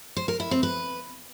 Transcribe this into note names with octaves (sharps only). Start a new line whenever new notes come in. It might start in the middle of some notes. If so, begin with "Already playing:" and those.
C5
A#4
E4
C4
B4